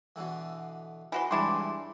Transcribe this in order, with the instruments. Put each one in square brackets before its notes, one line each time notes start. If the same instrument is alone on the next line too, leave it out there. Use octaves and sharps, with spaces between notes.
[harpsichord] B2 D3 E3
[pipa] E3 F#4 C6 [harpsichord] B4
[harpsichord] C#2 E3 G3 [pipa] D4 E4 G#4 [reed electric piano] C6 D6